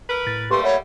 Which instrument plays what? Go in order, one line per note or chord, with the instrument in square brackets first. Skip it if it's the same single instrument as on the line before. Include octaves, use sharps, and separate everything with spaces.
[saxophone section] A#4 B4
[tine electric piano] A2 A6
[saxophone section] G3 A3 A#3 [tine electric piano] G4 B4 C#6 [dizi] C6
[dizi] C#5 [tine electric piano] E5 F#5 B5